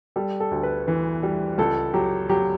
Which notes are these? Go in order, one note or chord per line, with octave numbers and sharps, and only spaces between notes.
G3 A4
A4
D2
B4
E3
G3
C#2 A4
F#3 G4
F#3 G4